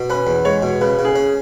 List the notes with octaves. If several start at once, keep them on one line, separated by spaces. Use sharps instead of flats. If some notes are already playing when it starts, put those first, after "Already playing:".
Already playing: B2
C#4 B4
E2
G#3 C#5
B2
C#3 B4
C#3
G#4
C#4